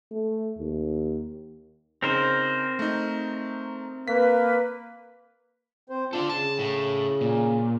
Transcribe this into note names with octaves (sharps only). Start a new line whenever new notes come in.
A3
D#2
C#3 C4 D#4 A#4 C5
A3 D#4
A#3 B4 B6
C4 C5
D4 F4 A4
C#3 A5
A2
A#2